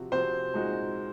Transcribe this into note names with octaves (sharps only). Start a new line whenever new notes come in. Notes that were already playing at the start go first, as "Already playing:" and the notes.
Already playing: C3 F3 C4 F#4
C3 F3 C4 F#4 C5
A#2 G#3 D#4 F#4